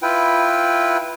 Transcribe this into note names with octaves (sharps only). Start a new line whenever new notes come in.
E4 F4 B4 G5